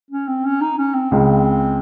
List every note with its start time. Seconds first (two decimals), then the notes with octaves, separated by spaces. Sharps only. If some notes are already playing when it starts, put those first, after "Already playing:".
0.11 C#4
0.28 C4
0.45 C#4
0.61 D#4
0.78 C#4
0.94 C4
1.11 C#2 C#3 G#3